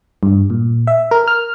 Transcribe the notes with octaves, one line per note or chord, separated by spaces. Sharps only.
G2
A#2
E5
A#4
F6